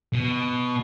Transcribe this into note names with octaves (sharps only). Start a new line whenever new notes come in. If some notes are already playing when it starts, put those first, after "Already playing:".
B2